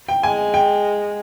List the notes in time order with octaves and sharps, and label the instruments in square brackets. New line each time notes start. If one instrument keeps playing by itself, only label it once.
[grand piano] G5
[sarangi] G#3 [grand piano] G#5
[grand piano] G5